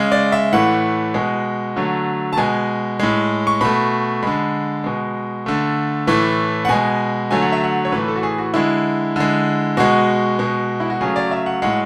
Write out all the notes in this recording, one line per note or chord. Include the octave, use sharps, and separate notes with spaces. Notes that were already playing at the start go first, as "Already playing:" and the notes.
Already playing: C#3 G#3
D5
E5
A2 E3 A3 F#5
B2 G#3
D3 F#3 A3
A5
B2 G#3 G#5
A2 G#3
C#6
B2 A3 B5
D3 G#3 B5
B2 G#3
D3 A3
A2 E3 A3
F#5
B2 G#3 G#5
D3 F#3 A3 G#5
F#5
E5
F#5
C#5
A2 E3 A3 B4
A4
F#4
G#4
F#4
D3 G#3 E4
D3 G#3
B2 G#3 F#4
B2 G#3
E4
F#4
C#3 F#3 A3 G#4
D5
E5
F#5
A2 G#3 F#5